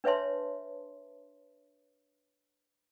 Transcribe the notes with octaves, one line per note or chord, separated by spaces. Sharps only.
D4 B4 C#5 E5 A5 C6